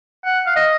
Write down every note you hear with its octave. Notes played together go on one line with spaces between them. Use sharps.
F#5
F5
D#5